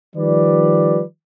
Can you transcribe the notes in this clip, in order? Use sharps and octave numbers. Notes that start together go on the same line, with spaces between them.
D#3 F3 G3 B4 D5